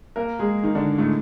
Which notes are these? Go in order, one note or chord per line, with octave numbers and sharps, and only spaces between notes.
A#3 A#4
G#3 G#4
D#3 D#4
D3 D4
A2 A3